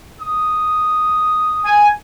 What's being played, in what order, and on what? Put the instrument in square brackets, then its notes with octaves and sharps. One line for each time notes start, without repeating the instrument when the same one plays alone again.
[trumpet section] D#6
[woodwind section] G#5